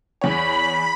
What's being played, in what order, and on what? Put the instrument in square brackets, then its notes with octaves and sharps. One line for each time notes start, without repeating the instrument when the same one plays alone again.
[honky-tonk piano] E2 C#5 [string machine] B5